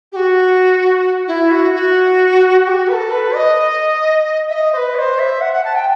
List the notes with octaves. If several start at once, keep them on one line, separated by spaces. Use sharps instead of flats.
G4
F#4
E4
F#4
F#4
G4
F#4
B4
A4
B4
D#5
E5
D#5
C5
B4
D#5
C5
E5
F#5
F#5
A5
G5